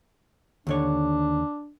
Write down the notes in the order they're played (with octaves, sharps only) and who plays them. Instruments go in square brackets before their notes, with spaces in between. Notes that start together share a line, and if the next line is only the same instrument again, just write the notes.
[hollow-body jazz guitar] D#2 D3 C#5 [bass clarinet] D4